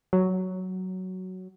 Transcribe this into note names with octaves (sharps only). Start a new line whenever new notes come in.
F#3